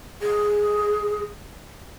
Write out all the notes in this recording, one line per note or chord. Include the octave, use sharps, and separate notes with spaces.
G#4